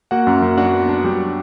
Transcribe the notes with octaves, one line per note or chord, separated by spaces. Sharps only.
A#3 F#4 F#5
F#2
F#2
D4 F#4 F#5
B3
D4
F#3 G3 G4